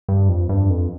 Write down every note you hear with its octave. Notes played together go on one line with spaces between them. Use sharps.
G2
F2
G2
F2